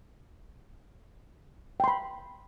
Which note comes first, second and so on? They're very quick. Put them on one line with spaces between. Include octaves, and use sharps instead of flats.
G5 C6 B5